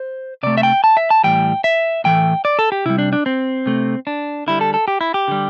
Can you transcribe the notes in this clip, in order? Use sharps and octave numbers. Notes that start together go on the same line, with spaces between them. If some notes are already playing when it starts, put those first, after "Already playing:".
Already playing: C5
C3 A3 D5
E5
G5
A5
E5
A5
A2 E3 G3 G5
E5
A2 E3 A3 G5
D5
A4
G4
C3 G3 E4
D4
D4
C4
C3 A3
D4
D3 G3 E4
A4
A4
G4
E4
G4
D3 G3